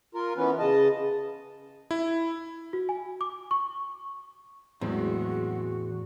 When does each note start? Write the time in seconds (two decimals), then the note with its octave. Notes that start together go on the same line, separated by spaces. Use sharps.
0.15 F4 A#4
0.37 E3 B3 C#4 B4
0.59 C#3 D#5 A5
1.91 E4
2.73 F#4
2.89 G#5
3.21 D6
3.51 C#6
4.81 E2 A2 F#3 G#3 C4 F#4